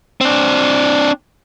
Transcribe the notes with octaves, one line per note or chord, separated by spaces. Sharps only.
C4 D4